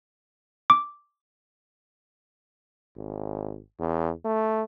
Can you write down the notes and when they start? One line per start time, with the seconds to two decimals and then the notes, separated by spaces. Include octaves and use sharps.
0.70 D6
2.97 G#1
3.79 E2
4.25 A3